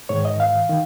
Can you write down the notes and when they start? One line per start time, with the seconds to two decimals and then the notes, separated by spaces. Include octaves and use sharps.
0.09 G#2 D#3 C#5
0.25 D#5
0.40 F5
0.69 D#3